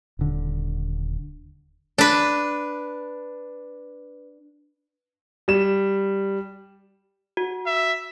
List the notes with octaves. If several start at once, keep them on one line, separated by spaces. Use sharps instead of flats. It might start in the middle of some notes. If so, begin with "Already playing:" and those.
D#1 D3
D4 B4
G3 E7
F#4
E5